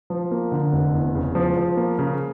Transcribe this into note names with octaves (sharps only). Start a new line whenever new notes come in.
F3
A#3
D3
F1
E2
C#3
F3
F3
A#3
C#3